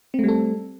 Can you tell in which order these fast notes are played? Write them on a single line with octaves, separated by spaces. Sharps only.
C4 A3 G3 A4